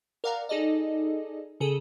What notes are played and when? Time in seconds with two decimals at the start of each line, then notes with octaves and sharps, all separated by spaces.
0.24 A#4 D5 F5 F#5 A#5
0.49 D#4 G#4 A4 D5 D#5
1.60 C#3 G#4 A4